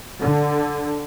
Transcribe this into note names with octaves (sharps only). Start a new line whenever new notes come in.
D3